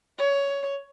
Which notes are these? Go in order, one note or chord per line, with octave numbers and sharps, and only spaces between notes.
C#5